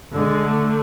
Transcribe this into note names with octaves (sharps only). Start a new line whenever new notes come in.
D3 G#3
A3